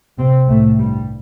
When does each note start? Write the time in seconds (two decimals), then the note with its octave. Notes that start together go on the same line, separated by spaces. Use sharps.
0.19 C3 C4
0.48 C2 A2 C3 A3
0.78 G2 G3